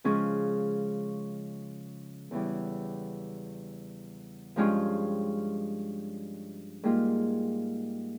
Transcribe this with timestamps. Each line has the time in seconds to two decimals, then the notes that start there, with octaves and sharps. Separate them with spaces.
0.04 C#3 F3 G#3 C#4
2.31 E2 C#3 E3 G3
4.56 G2 F3 G#3 C#4 F4
6.84 G#2 G3 A#3 F4